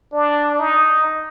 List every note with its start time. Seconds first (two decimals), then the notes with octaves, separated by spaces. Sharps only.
0.12 D4
0.59 D#4